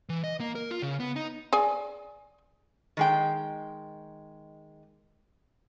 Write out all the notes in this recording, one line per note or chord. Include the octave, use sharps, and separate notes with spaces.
E3
D#5
A#3
A#4
F4
C#3
B3
D#4
G#4 D5 G#5
D#3 G#3 G5